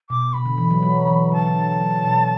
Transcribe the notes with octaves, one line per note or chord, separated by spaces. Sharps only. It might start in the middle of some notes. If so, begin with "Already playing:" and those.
B2 D6
B2 B5
D3
E3
F#3
F#3
E3
D3 A5
D3
F#3
B2